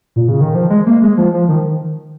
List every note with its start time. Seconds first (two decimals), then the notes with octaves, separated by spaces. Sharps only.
0.16 A#2
0.28 C#3
0.41 D#3
0.55 F3
0.70 G#3
0.86 A#3
1.02 G#3
1.17 F3
1.34 F3
1.49 D#3